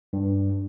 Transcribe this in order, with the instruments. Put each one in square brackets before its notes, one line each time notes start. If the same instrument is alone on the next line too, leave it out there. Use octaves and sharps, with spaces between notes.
[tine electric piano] G2